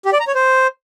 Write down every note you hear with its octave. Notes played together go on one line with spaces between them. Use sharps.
G4
D5
A#5
C#5
C5